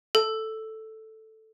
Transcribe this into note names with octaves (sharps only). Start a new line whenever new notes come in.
A4